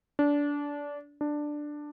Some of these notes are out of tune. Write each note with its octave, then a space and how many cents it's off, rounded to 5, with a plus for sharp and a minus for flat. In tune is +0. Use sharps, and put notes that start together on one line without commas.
D4 -20
D4 +10